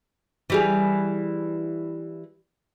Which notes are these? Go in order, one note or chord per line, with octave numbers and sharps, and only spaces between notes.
E3 G3 G#4